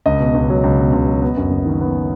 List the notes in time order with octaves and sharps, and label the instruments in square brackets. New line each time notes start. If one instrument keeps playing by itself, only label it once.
[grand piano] C#2 D#5
B2
C#2
F#3
C#2
B2
C#2
F#3
B3
F#2
F#1
D#3
B3